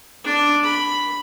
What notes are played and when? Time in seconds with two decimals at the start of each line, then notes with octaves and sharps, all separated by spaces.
0.24 D4 D6
0.64 B5